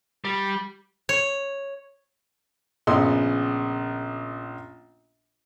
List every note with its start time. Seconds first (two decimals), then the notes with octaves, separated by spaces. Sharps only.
0.24 G3
1.09 C#5
2.87 A#1 C#3 B3 D#5 C6 E6